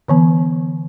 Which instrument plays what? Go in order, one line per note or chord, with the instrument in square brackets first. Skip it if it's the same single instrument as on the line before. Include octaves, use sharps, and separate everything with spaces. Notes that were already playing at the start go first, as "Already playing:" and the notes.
[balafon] D3 E3 B3